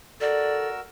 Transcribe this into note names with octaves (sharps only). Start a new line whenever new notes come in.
F#4 A4 A#4 D5 E6